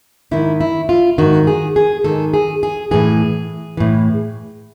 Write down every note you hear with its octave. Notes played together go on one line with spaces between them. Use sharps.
G#2 D#3 E4
E4
F4
G#2 D#3 F#4
G#4
G#4
G#2 D#3 A4
G#4
G#4
A2 E3 G#4
A2 E3